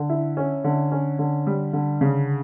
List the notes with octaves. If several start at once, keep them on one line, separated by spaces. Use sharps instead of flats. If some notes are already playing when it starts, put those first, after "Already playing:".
Already playing: D3
E4
C#4
D3
C#4
D3
G3
D3
C#3